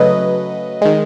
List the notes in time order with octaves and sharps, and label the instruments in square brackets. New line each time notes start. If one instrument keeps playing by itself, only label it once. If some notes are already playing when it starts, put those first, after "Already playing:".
Already playing: [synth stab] C#3 F#3 A3 B4 D#5
D#3 G#3